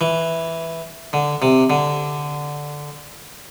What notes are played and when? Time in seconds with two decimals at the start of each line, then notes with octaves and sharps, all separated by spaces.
0.01 E3
1.13 D3
1.42 C3
1.70 D3